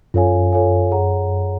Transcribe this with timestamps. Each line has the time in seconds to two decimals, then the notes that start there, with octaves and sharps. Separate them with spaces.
0.14 F#2 F4 A4 C#5 F5 G#5
0.53 F4 A4 C#5 F5 G#5
0.91 G#4 C#5 F#5 A#5